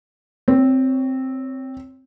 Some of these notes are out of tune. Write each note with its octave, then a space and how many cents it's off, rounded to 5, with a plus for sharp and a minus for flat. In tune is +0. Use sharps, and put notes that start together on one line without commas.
C4 +0 C#5 +15